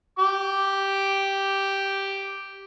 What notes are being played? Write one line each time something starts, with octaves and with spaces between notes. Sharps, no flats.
G4 D6